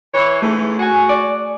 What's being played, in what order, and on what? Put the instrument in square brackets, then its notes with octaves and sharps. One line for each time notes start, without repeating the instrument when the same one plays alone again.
[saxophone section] E3 C#5
[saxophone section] G#2 C#3 E3 [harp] A3
[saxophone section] F#4 [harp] G#4 G#5
[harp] D5